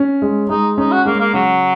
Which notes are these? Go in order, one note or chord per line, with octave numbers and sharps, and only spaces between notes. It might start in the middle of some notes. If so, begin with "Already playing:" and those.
Already playing: C#4
G#3
G#3 D#4
C#4 D#4
F#4
G#3 A#3
A#3
C#3 F#3